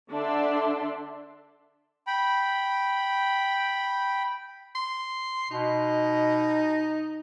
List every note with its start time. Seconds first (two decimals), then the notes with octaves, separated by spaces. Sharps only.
0.10 D3 D4 A4 D5 E5 C6
2.07 G5 B5
4.75 C6
5.51 B2 D#4